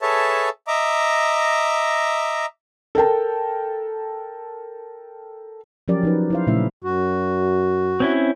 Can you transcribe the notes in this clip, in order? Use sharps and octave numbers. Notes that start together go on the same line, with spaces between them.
G#4 A4 B4 C#5 E5 A5
D#5 E5 A#5 D6
A4 A#4 G5 A5
F3 F#3 C#4 G4 A#4 D5
F3 D#4 B4
E4 C5 F5
A#2 C#3 A3 C#4 E4 E5
F#2 F#4
C4 C#4 E4